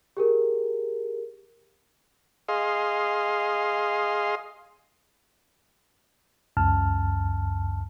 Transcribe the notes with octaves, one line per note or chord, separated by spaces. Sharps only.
G4 G#4 A#4
G#4 D#5 F5 C6
C#2 F#2 A5 F6